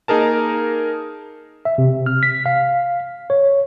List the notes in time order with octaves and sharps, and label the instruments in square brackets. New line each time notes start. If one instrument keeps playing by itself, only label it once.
[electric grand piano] A#3 D#4 G#4 A#4 A5
[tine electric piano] E5
C3
F6
B6
F5
C#5